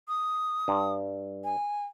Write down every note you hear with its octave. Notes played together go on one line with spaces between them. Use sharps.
D#6
G2
G#5